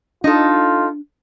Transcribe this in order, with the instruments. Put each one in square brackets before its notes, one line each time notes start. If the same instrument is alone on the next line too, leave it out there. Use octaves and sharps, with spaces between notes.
[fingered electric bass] D4 [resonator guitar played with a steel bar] D#4 A4 [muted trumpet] F4